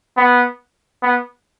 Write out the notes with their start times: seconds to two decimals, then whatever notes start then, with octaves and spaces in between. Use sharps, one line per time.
0.17 B3
1.03 B3